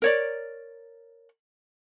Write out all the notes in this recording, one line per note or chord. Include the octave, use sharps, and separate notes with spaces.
A#4 C#5 D5